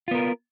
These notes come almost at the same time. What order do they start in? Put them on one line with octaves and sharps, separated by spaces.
F4 B3 A#4